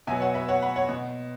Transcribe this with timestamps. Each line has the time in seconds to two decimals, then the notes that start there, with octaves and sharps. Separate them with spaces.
0.07 B2 F#3 B3 E5 G#5
0.21 C#5 F#5
0.34 B4 E5
0.48 C#5 F#5
0.62 F#5 B5
0.76 C#5 F#5
0.89 B2